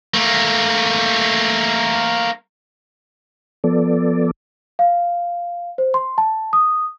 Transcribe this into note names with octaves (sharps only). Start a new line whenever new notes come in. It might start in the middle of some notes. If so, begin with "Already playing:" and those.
A3 A#3
F3 B3 A4 D5
F5
C5
C6
A5
D#6